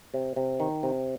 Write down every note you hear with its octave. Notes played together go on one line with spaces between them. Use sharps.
C3
C3
D#3
C3